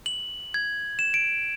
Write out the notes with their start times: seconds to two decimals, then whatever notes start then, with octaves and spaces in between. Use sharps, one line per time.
0.06 F#7
0.54 G#6
0.99 E7
1.14 D7